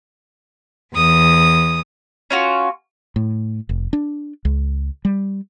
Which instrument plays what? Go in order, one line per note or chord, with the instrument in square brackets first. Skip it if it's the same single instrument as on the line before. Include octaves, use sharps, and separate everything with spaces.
[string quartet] E2 D#6
[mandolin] C#4 F4 F#4
[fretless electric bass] A2
F1
D4
C#2
G3